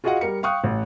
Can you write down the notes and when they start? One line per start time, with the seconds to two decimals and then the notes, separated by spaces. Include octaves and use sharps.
0.04 F4 F#4 G#4 D#5 F5 F#5
0.21 G3 A#4 C#7
0.43 F5 G5 C#6 D#6 F#6
0.64 A1